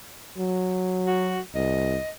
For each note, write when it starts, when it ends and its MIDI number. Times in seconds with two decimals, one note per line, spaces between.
0.38 1.41 54
1.07 1.40 66
1.55 1.98 36
1.55 2.10 75